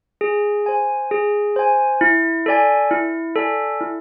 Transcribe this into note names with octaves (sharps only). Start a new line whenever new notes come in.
G#4
C5 G#5
G#4
C5 G#5
E4
A4 D5 G#5
E4
A4 D5 G#5
E4